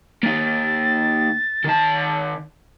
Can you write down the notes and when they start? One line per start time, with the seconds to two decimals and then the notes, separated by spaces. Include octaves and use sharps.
0.23 A#3 D#4 A6
1.64 D#3 A5